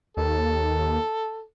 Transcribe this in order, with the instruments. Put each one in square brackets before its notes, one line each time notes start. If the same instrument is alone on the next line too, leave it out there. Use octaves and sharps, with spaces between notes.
[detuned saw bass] D#2 [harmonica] A4